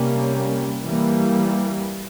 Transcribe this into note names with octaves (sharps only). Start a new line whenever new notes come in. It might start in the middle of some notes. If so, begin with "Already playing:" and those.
Already playing: C3 G3 A#3 C#4
E3 G3 A#3